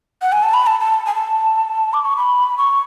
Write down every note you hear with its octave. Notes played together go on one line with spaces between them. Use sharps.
F#5
G#5
A5
B5
A5
A5
G#5
A5
D6
C#6
B5
C#6